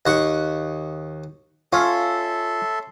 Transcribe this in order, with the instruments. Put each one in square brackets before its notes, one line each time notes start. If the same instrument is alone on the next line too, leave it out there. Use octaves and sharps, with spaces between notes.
[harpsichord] D#2 F#5 C#6
[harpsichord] C#4 [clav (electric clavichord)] F4 [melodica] A4 E5 C6